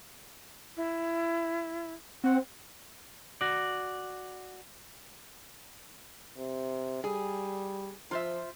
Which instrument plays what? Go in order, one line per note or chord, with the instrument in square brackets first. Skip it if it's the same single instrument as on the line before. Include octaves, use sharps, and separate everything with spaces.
[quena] E4
[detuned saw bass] C4 [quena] F#5
[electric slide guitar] F#4 D5
[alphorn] C3
[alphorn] G3 [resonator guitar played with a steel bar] G#4
[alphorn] F3 [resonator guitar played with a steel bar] F4 C5 E5